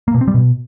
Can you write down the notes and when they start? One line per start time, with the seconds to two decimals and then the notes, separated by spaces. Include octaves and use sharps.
0.08 A#3
0.14 B2
0.21 C4
0.28 G3
0.34 B2